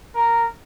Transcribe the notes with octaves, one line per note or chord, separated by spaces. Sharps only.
A#4